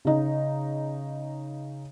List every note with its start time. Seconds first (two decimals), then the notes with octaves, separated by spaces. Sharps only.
0.05 C#3 D#4